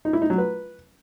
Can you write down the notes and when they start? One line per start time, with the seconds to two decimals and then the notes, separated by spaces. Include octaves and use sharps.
0.05 D#4
0.13 E4
0.22 D#4
0.30 F#3
0.38 B4